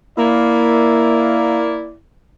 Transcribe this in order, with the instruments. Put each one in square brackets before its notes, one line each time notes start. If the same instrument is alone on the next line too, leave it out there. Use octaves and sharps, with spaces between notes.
[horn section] A#3 E4 D5